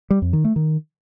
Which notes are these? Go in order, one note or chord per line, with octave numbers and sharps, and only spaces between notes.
G3
F2
D#3
A3
D#3